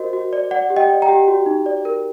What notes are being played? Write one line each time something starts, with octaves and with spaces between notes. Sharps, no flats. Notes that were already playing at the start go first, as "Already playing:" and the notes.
Already playing: F#4 A#4 C5 D#5
F#4
D5
D5 F#5
G4
D#5 G5
D5
G5 A#5
G4
F#4
D#4
D5
A#4